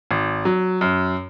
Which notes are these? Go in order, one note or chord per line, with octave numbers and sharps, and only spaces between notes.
G#1
F#3
F#2